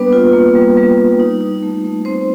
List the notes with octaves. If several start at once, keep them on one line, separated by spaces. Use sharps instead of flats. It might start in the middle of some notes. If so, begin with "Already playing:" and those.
Already playing: G3 A#3 B3 D4 B4
F4
A#3
G3
G3
G3
D#4
D#4
A3
A3
A3 C4 C5